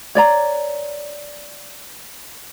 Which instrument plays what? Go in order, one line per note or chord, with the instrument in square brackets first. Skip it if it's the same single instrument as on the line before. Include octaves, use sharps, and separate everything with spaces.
[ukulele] C#5 D5 A#5